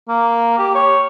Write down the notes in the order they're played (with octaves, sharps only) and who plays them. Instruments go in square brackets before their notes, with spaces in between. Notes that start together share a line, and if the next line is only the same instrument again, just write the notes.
[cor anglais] A#3
G4
C#5